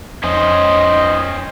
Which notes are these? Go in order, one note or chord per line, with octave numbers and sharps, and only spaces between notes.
F2 C#4 C5 D#5